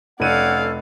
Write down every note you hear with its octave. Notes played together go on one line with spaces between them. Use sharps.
F1 C#4 A4 D5 F5 F#5 G#6 D#7